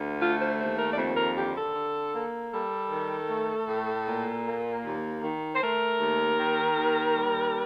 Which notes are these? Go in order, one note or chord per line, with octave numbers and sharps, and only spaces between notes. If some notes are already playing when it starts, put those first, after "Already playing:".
Already playing: D2
A3 F4
C5
D#2 C5
A#4
D5
F2 C5
A#4
D3 G4
A4
D3
A#3
G3 A4
D#3
A3
A2
A#2
A#3
D#2
D#3
C5
A3 A#4
D#2
D#3
D#2
G3